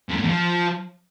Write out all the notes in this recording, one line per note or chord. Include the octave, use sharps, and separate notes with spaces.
F2
A2
E2
F3